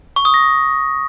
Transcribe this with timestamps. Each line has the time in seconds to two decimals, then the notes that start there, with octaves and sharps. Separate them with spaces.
0.16 C#6
0.25 D#6
0.34 A#6